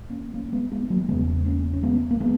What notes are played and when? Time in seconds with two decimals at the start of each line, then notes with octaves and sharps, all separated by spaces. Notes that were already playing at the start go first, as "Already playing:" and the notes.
Already playing: G#2
0.10 A#3 C#4
0.34 A#3 C#4
0.52 G#3 B3
0.72 G#3 B3
0.90 F#3 A#3
1.09 E2 C#3 G#3 B3
1.46 A#3 C#4
1.73 C#4
1.83 G#3 B3
2.11 A#3
2.20 G#3 B3